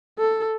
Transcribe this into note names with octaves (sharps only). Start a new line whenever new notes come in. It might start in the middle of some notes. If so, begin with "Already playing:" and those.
A4